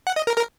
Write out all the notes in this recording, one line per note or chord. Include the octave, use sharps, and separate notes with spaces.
F#5
D#5
A#4
A#4